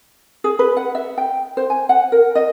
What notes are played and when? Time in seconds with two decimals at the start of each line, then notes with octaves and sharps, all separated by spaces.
0.44 G#4
0.59 B4
0.77 F#5
0.95 E5
1.18 G5
1.57 C5
1.70 G#5
1.89 F#5
2.12 A#4
2.35 D#5